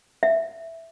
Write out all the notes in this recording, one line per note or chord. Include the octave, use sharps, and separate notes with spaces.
E5